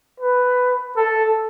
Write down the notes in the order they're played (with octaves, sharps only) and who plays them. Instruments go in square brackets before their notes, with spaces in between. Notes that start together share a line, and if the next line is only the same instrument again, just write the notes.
[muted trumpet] B4
A4